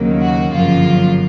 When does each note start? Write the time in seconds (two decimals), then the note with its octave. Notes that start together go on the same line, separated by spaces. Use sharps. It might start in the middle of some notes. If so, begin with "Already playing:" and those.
Already playing: D#2 C#3 F#3 A#3
0.21 F#4
0.51 G1 F#2 C#3 F3 A#3 F4